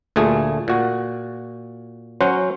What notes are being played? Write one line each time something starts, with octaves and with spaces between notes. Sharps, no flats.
D2 A#2 A3 G#4
A#2 F#4
F#3 C#4 C5 F#5